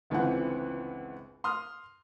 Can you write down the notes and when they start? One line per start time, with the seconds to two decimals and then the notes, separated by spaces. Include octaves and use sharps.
0.10 G1 C#2 E3 C4 F#5
1.44 C6 D#6 F6